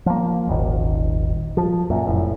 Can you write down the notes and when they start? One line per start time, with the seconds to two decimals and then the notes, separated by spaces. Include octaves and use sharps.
0.06 F3 A#3
0.47 D#1 G#1 D#3
1.57 F3
1.90 F#2 A#2
2.07 F1 A2